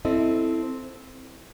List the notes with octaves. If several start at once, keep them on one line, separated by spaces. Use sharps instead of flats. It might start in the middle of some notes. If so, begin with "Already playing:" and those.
C4 E4 A4 D#5